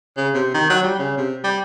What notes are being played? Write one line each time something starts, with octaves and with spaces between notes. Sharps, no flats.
C#3
C3
D#3
F#3
G3
C#3
C3
G3